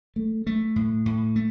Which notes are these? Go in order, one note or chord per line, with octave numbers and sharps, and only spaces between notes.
A3
A3
A2
A2
A3